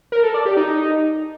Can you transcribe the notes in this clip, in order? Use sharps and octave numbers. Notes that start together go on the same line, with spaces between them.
A#4
A4
D5
G4
D#4